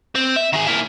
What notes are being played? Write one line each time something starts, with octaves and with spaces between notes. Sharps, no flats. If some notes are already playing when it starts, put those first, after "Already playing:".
C4
E5
D#3 G#4
A#3 E4